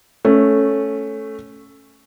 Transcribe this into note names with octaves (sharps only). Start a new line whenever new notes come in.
A3 C#4